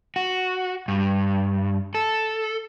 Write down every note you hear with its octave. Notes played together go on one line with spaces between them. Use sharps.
F#4
G2
A4